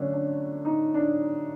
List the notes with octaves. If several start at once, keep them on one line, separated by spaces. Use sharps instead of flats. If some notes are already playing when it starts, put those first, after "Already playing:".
Already playing: D3 F#3 A3 C#4 D4
D4
D#4
D4